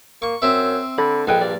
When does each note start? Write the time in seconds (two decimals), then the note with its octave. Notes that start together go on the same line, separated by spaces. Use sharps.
0.22 A#3 C#6
0.42 F#2 C4 E5
0.98 D3 B5
1.27 A#1 G#3 A4 B4 G5
1.41 G2 D5